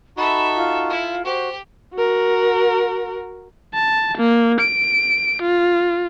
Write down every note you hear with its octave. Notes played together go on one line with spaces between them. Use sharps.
D#4 F#4 A4 E5 B5
F4
E4
F#4 G4 C5
F#4 A#4
A5
A#3
D7
F4